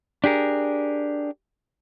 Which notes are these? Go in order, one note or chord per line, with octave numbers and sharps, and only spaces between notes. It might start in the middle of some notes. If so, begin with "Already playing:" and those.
D4 G4 G#4 A#4